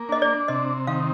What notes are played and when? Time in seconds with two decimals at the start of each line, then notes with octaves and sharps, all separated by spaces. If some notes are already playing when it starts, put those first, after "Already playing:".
Already playing: A#3
0.09 D4 D#5
0.22 D5
0.48 C3 D#5
0.87 D#3 F5